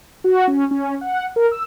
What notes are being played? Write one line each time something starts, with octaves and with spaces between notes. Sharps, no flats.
F#4
C#4
C#4
F#5
A#4
E6